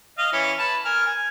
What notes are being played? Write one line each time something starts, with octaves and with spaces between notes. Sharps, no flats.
D#5 F5
E3 C#4
B4 A5
A#4 G#5 F6
G#5